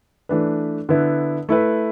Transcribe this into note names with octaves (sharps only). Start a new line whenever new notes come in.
E3 A3 D4 B4
D3 B3 E4
A3 E4 B4